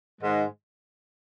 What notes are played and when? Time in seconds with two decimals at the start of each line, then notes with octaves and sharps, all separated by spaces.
0.21 G#2 D#3 G#3